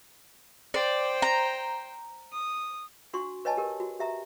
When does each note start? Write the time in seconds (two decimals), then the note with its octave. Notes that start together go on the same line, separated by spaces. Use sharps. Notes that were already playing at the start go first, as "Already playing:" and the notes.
0.74 C5 D5 G5
1.22 A#5
2.32 D#6
3.13 D4 F#4 C6 C#6
3.45 B4 C#5 D#5 G#5 A5
3.57 G4 A#4
3.80 F#4
4.00 G4 E5 A#5